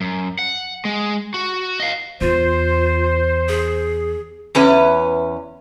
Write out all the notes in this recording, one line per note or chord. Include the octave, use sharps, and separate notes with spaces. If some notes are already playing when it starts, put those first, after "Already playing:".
F#2
F#5
G#3
F#4
D#5 F5
E2 F4 C5
G#4
E2 C#4 B4